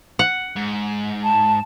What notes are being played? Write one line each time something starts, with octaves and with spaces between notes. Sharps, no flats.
F#5
G#2
A5